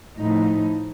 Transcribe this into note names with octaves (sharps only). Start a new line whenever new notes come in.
A2 F3 D#4